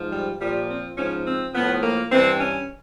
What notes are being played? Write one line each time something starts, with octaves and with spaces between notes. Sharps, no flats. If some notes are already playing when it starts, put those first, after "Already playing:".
Already playing: G#2 F3
G3
A#2 F3 G3
C4
G#2 F3 C#4
C4
A2 F3 B3
A#3
G2 E3 C4
C#4